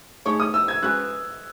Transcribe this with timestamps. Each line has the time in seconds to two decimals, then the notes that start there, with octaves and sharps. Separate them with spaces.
0.25 A3 D#4 G#4 C#5 C#6
0.40 D#6
0.54 E6
0.68 G#6
0.83 G#3 C#4 F#4 B4 F#6